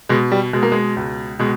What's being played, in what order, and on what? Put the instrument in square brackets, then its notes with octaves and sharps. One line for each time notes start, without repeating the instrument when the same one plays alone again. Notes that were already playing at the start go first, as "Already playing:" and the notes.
[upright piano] B2 G#3
G3
B2 G#3
A#3
G#3
C#2
B2 G#3